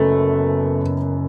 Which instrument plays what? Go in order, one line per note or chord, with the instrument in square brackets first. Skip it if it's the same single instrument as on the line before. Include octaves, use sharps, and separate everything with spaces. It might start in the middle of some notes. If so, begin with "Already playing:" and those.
Already playing: [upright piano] F#1 F#2 F#3 B3 [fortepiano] A3